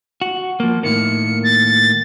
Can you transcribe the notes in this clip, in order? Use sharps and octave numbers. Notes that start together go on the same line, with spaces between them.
F#4
F3 A#3
A2 D#3 A#3 C#7
A6